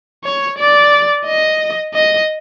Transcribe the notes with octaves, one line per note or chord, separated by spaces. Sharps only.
C#5
D5
D#5
D#5